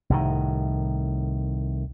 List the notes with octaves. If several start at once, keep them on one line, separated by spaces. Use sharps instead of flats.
C2 A2 D#3